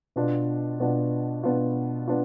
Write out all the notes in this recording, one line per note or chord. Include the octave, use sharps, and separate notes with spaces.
B2 B3 D4 F4
B2 B3 D4 F4
B2 B3 D4 F4
B3 D4 F4